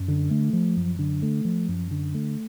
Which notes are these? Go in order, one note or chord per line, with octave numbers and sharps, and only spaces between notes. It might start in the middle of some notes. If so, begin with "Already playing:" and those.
Already playing: F#2
D3
A3
F3
F#2
D3
A3
F3
F#2
D3
A3